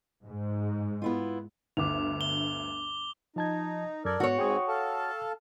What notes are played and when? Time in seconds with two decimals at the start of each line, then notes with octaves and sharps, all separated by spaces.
0.25 G#2
1.02 B3 E4 F4
1.77 G1 D2 D6 F7
2.21 G7
3.36 F3 D#4 A5 G#6
4.05 F#2 A4 A#4 D5 G#6
4.20 G#2 B3 F#4 C#5
4.39 G#2 C4 G#4 G5 C#6 D#6
4.68 A4 F5 A5